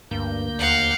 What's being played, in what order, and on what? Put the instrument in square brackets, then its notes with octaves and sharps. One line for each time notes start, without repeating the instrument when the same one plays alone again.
[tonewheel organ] D2 A#3 G6 [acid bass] G2
[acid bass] D#2 [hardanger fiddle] F5 F#5